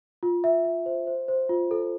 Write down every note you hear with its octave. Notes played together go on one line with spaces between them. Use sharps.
F4
E5
E5
C5
C5
C5
F4
A4